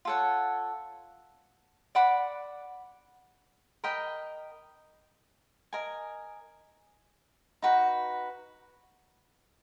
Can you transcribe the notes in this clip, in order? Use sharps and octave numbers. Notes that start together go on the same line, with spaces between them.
F4 A4 C#5 F#5
D5 F#5 B5 D6
A#4 D#5 G5 B5
A#4 D#5 G#5
D#4 F#4 B4